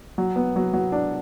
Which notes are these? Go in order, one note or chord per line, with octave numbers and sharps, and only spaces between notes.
F#3
B3
F#3
F#3
D4